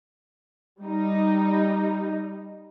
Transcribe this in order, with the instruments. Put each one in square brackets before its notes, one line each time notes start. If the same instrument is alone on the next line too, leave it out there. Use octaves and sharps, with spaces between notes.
[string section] G3 D#4